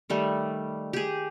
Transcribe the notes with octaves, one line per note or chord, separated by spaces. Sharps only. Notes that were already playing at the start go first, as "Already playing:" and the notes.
D#3 G3 A3
G4 G#4